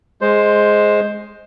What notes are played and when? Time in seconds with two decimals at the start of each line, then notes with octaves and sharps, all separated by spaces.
0.21 G#3 C5